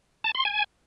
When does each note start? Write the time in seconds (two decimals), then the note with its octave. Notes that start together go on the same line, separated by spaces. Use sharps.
0.24 A5
0.35 C6
0.45 G#5